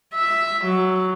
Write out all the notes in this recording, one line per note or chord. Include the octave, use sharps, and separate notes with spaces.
E5
F#3